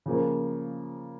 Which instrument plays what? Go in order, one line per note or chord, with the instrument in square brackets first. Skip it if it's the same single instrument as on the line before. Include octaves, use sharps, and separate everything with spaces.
[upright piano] C#3 F3 A#3